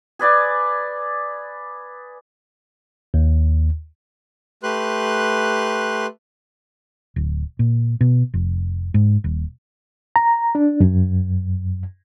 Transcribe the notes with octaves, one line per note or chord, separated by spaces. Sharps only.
G#4 B4 D5 G#5
D#2
A3 G4 B4 C6 F#6
D1
A#2
B2
F1
G#2
D#1
A#5
D4
F#2